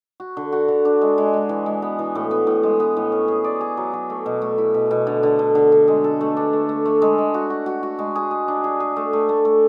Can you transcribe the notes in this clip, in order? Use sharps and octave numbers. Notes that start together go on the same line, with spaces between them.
F#4
D3
F#4
D3
D4
G#3
G#3
G#3
E3
G#3
B3
E3
A2
B3
A2
G#3
B3
A2
C#4
G#4
D5
G#4
F#3
F#3
A3
B2
A3
E4
B2
B2
D3
D3
D3
D3
D3
G#3
A4
A3
D4
A3
A3
A3
G#3
G#3
F#4
F#4
F#4
F#4
G#3
G#4
G#4
D4
G#4
G#4
A3
A3
A3
A3